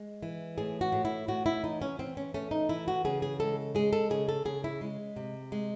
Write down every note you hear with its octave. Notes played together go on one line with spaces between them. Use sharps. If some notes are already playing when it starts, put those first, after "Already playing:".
Already playing: G#3
E3
A2 G#4
F#4
A2
E4
A2 F#4
E4
E3 D#4
C#4
E3 C4
C#4
A3 C#4
D#4
E3 E4
F#4
C#3 G#4
G#4
G#3 A4
G#3 G#4
A4
C#3 G#4
A4
C#3 G#4
E4
G#3
C3
G#3